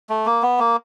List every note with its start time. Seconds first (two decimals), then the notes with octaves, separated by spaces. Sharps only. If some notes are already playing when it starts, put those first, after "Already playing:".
0.10 A3
0.26 A#3
0.42 B3
0.59 A#3